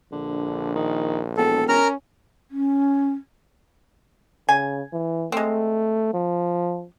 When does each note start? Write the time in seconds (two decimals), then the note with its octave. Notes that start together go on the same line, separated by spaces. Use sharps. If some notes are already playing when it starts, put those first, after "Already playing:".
0.12 A#1 D3
0.75 D#3
1.37 E1 A4
1.69 C#4 A#4 A#5 F6
2.51 C#4
4.49 C#3 G#5
4.93 E3
5.32 G#3 A3 C4
6.14 F3